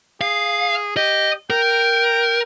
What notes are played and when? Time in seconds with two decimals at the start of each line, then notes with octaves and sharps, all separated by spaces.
0.21 G#4 F5
0.97 G4 D#5
1.50 A#4 G5